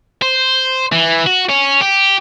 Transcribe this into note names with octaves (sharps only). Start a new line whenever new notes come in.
C5
E3
F#4
C#4
G4